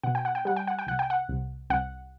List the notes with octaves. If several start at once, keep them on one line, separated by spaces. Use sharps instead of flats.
B2 F#5
G5
F#5
G5
G3 F#5
G5
F#5
G5
C2 F#5
G5
F#5
C2
C2 F#5